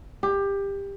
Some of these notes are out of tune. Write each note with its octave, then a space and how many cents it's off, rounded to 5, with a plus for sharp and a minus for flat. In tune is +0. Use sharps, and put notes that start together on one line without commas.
G4 +20